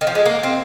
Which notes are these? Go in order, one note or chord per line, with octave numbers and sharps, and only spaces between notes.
D#3
F3
G#3
A#3
C4